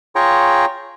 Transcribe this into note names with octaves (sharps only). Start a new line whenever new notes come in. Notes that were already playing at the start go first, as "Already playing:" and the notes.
F4 G#4 C#5 G5 A#5 C#6